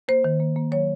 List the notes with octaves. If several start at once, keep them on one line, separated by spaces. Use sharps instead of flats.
A#3 C5
D#3
A#3
A#3
F#3 C#5